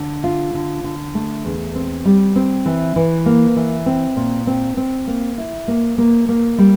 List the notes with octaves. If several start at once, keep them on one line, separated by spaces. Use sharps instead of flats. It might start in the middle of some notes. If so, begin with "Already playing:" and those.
Already playing: D3
F4
D3
D3
A3
E2
C4
G3
C4
E3
E3
A#3
E3
C4
A#2
C4
C4
A#3
E4
A#3
A#3
A#3
G3